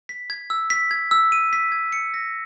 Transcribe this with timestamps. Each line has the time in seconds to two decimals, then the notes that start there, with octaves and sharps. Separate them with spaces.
0.09 B6
0.30 G#6
0.50 E6
0.70 B6
0.91 G#6
1.11 E6
1.32 D#7
1.53 B6
1.72 G#6
1.92 C#7
2.14 A#6